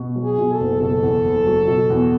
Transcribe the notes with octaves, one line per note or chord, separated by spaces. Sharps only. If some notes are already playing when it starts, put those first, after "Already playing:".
Already playing: B2
F#3
G#4
B2
A4
F#1
B2 A4
E2
F#1
F#3
B2
E2